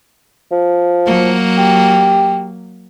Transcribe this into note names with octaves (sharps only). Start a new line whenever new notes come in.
F3
F#3 A#3
G4